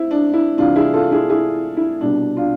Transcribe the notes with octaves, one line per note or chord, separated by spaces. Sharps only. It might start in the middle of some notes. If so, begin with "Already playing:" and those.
Already playing: E4 C5
D4
E4
C2 C3 E3 D4 F4
E4 G#4
F4 A4
E4 G#4
E4 G#4
E4
C2 B2 D4
D4 F4